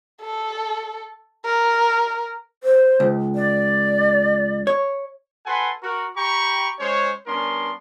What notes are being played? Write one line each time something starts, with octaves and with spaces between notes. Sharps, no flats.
A4
A#4
C5
C#2
D5
C#5
F#4 A4 B4 F#5 G#5 C6
F#4 A#4
G4 G5 A#5 B5 C#6
G#3 C#4 C5 C#5
G3 B3 C#4 D4 A#4 C6